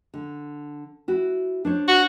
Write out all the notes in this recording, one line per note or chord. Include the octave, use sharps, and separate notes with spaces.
D3
E4 F#4
D4 C5 C#5
F#4